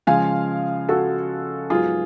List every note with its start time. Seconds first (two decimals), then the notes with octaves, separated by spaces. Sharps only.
0.07 C#3 F3 G#3 F5 G#5
0.89 F#4 A4
1.70 G#2 F#3 B3 F4 G#4